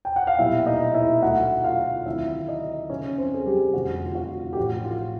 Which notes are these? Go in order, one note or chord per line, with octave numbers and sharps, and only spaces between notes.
G5
F#5
F5
B1 A#2 G3 E4 E5
D#4 D#5
E4 E5
D2 D3 F#3 A3 F#4 F#5
F4 F5
D2 C3 D#3 F#3 E4 E5
D#4 D#5
F#2 C#3 F3 C#4 C#5
C4 C5
G#4
G3 G4
G4
F1 F2 D3 F#4
F4
F#4
G4
A1 A2 F3 F#4
F4